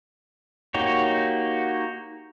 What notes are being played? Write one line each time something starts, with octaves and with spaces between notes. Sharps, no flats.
A#3 D#4 F#4 G4 C#5